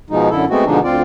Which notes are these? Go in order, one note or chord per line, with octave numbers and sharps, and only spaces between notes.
B2 F3 G#3 D#4
F#2 D3 E4 A4
G#3 A3 B3 C4 F#4
B2 D3 F3 G#3 D4 D#4
D2 C4 F4 D5